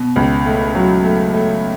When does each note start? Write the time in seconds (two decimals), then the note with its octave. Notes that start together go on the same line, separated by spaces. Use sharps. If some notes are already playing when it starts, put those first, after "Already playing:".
Already playing: B2
0.16 C#2
0.46 A3
0.75 F#3
1.04 A3
1.34 A3